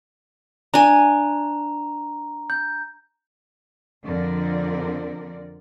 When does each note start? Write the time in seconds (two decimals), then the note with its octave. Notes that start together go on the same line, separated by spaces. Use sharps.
0.74 D4 G#5 A#5
2.50 G6
4.05 F2 D3 F3 A#3 A#4 D5